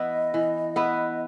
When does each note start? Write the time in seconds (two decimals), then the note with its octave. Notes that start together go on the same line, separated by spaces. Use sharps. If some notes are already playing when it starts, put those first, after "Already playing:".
Already playing: E3 B3 E4 B4 D#5
0.34 E3
0.76 B3 E4 B4